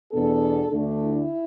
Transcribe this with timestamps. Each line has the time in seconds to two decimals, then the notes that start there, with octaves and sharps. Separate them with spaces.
0.11 E2 B2 B3 D4 A4
0.72 D2 D3 A3 D4
1.03 E4